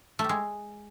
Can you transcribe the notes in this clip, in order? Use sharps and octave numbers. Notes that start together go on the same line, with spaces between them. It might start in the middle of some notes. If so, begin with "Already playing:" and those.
A3
G3
G#3